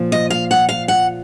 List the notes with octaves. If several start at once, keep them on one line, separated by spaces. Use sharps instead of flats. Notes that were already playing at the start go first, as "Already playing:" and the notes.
Already playing: A#2 F3
D#5
F5
F#5
F5
F#5